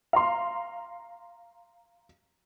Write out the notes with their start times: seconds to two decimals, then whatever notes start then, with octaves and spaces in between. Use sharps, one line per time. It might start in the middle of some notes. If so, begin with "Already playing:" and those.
0.13 F5 A#5 C6